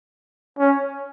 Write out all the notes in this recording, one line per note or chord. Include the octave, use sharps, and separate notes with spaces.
C#4